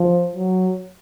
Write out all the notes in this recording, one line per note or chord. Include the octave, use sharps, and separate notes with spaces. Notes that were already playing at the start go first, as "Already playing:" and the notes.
Already playing: F3
F#3